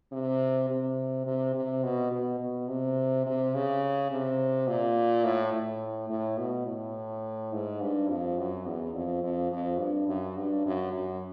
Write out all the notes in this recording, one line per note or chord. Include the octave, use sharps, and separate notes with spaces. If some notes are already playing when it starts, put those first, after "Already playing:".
C3
C3
C3
C3
B2
B2
B2
C3
C3
C#3
C3
A#2
A2
A2
A2
B2
A2
G#2
G2
F2
F#2
E2
F2
F2
F2
G2
F#2
G2
F#2
F#2